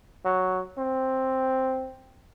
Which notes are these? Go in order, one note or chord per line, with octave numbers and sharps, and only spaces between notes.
F#3
C4